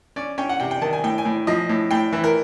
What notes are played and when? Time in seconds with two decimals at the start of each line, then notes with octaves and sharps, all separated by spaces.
0.16 C#4 D5
0.38 C#4 G5
0.49 F#5
0.60 C3 G5
0.71 G5
0.81 D#3 A5
0.93 G#5
1.04 A2 G5
1.18 G#5
1.25 A2
1.47 F3 D#5
1.69 A2
1.91 A2 G5
2.12 E3
2.24 A#4